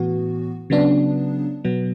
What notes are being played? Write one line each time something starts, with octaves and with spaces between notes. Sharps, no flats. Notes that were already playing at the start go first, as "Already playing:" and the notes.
Already playing: A2 E3 B3 F#4
C#3 F#3 B3 D4
B2 F#3 B3